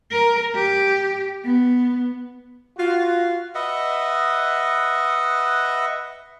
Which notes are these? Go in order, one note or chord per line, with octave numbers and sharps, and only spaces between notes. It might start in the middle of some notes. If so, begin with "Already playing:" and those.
A#4
G4
B3
F4 F#4
B4 D#5 E5 F#5